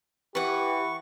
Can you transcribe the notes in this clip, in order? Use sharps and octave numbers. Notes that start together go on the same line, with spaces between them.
E3 G4 B4 F#5 C#6